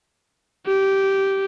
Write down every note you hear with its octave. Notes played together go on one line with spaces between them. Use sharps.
G4